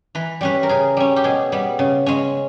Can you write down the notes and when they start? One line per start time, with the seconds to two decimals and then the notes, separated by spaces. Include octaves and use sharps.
0.15 E3 B4
0.41 G3 C#4 B4
0.63 A#4
0.69 C#3 G#4
0.97 G3 C#4
1.16 G4
1.24 B2 G#4
1.52 G3 B3
1.79 C#3
2.06 G#3 C#4